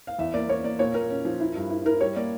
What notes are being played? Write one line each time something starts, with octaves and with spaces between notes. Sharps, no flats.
F5
E2 E5
A#3 D5
A#3 C#5
A#3 D5
A#2 C#5
A#2 A#4
C#4
F3
E4
G2
E4
E4 A#4
G3 C#5
A#3 D5